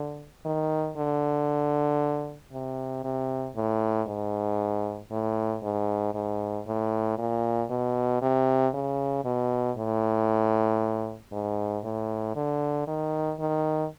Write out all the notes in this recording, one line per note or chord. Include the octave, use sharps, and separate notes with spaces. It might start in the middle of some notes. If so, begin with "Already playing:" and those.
Already playing: D3
D#3
D3
C3
C3
A2
G#2
A2
G#2
G#2
A2
A#2
B2
C3
C#3
B2
A2
G#2
A2
D3
D#3
D#3